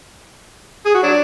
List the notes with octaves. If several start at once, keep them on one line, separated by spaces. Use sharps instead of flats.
G#4
F#4
F#3 D4